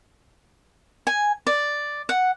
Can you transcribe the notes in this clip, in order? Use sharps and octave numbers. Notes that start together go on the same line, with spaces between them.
G#5
D5
F#5